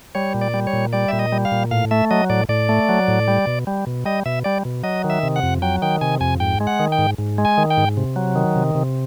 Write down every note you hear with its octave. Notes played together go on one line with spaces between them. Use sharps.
G3 C#5
A#2
D5
G3
C#5
A#2
G3 D5
A#2 E5
D#5
G3
F5
A#2
A2 F5
A3 E5
F#3 D#5
A2 D5
A2 D5
A3
F#3
A2
G3
B2
G3
B2
G3 D#5
B2 E5
G3 D5
B2
F#3 D#5
D#3
E5
C3
F#5
F2
F#3 G5
D#3 G5
C3 G#5
F2 G#5
G#2 G5
G#3
F#5
D#3
G5
G#2
G#2
G#3
G#5
D#3
G5
G#2
C3
F#3
D#3
C3
C3